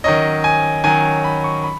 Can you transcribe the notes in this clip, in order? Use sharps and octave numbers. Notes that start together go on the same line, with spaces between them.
D#3 F#3 C#4 D#5
G#5
D#3 F#3 C#4 G#5
B5
C#6
B5